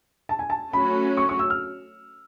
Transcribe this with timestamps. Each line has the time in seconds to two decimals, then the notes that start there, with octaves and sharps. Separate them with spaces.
0.29 A5
0.39 G#5
0.50 A5
0.73 F#3 A3 C#4 F#4 B5
1.17 C#6
1.29 C#6
1.39 E6
1.50 F6